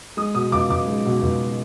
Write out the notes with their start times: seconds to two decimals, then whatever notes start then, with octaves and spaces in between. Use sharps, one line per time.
0.17 G#3 D#6
0.34 B2 D#6
0.52 C#2 D6
0.69 C#2 D6
0.87 G#3
1.05 B2
1.22 C#2